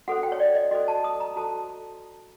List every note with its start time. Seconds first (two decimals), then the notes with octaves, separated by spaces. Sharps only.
0.08 F#4 A4 C5 F#5
0.23 G5
0.32 C#5
0.40 D5
0.55 D#5
0.71 F#4 A4 C5 D#5
0.88 A5
1.04 D#6
1.20 A#5
1.36 F#4 A4 C5 A5